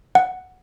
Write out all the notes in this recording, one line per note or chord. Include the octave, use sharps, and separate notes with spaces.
F#5